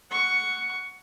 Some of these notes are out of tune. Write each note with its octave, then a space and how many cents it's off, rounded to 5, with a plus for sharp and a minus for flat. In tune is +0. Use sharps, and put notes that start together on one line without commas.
F#5 +0 C#6 +10